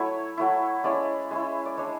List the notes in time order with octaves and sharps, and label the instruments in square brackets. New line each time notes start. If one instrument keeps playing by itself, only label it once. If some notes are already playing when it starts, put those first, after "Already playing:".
Already playing: [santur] F#3 A3 E4 C#5
F#3 A3 E4
G#3 C#4 E4 D5
G#3 C#4 E4
D5
G#3 D4 C#5